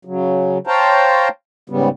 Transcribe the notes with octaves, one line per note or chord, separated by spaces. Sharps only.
C#3 F#3
C5 C#5 F5 G5 A5 A#5
G#2 C#3 G3 B3